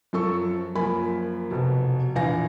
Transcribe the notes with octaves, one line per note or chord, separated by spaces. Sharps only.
F#2 F3 A4 C#6
F#2 F3 A#3 G#5 B5
F1 B2
A#1 E2 F5 G#5 A#6